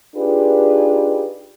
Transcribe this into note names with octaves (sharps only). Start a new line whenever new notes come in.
D4 D#4 F4 G4 G#4 B4